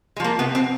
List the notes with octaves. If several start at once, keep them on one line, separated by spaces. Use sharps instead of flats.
G#3
F3 A#3
C3 B3
C4